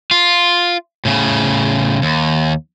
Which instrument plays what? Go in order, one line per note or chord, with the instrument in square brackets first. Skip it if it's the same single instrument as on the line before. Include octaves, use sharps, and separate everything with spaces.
[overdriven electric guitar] F4
A2 C#3
D#2